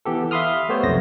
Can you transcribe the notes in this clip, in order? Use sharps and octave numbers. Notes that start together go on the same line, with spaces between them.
E3 B3 G4 A4
E5 F5 B5 C6 D#6 F6
A3 B3 G4 C5 C#5
B1 F2 C3 A#6